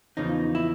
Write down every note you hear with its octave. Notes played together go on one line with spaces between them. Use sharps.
E2 C#3 F3 D#4
E4